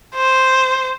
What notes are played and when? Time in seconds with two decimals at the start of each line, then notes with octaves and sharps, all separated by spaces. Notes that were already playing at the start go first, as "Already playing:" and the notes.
0.15 C5